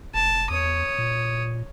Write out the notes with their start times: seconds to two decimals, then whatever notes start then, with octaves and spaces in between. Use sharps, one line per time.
0.14 F1 A5
0.50 E2 C#5 D#6
0.98 A#2